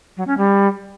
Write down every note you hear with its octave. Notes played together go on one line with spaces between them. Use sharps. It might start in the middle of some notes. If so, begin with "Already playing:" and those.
F#3
C#4
G3